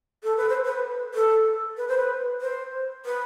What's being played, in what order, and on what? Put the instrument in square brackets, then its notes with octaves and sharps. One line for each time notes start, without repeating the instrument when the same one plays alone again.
[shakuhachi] A4
B4
C5
B4
A4
B4
C5
B4
C5
B4